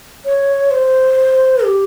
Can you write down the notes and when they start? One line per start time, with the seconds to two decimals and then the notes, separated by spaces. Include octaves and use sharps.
0.25 C#5
0.71 C5
1.64 G4